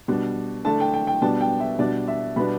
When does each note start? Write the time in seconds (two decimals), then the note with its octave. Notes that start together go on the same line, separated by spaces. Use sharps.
0.08 B2 G3 D4
0.65 D3 A3 D4 A5
0.80 G5
0.94 G5
1.07 G5
1.22 B2 G3 B3 D4 A5
1.41 G5
1.60 E5
1.79 B2 G3 D4 D5
2.08 E5
2.36 B2 G3 B3 D4 B5